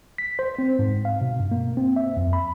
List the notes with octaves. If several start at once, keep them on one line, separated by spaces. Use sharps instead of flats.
B6
C5
C4
G#2
F5
B2
G2
A#3
C4
E5
F2
B5